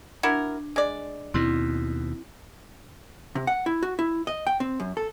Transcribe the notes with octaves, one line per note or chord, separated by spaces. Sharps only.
D4 E4 F#4 A#4 G#6
G#3 D5
D#2 B2 C4 E4
C3
F#5
E4
F#4
E4
D#5
G5
C4
F#2
A4